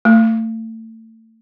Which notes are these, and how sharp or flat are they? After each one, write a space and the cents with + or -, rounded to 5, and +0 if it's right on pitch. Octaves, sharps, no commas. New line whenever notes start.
A3 +30